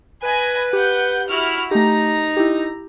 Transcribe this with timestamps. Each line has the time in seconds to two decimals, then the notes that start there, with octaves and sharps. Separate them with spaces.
0.23 B4 D#5 G#5 B5
0.73 G4 F#5 G6
1.29 E4 F#4 F6
1.71 A3 D#4 G4 A#5
2.37 E4 G4